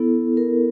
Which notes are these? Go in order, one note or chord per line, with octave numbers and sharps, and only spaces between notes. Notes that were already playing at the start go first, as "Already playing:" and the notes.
Already playing: B3 E4 A4
A#4